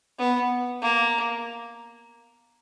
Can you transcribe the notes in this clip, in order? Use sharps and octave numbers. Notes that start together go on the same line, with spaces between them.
B3
A#3